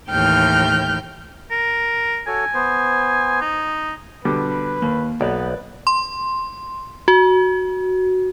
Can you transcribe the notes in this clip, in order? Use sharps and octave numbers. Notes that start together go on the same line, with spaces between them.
D#2 A2 E3 G5 F6 G6
A#4
F#4 A4 C#5 G#5
B3 C5
D#4
B2 D3 G3 B4
D#2 A#3
B1 B3 B4 D5
C6
F#4